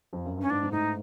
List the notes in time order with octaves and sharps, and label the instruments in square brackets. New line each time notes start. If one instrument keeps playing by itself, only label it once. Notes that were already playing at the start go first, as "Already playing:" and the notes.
[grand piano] F2
F#2
[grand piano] G2 [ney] C#4
[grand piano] G#2 [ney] D4
[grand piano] G#2
[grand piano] A2 [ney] D#4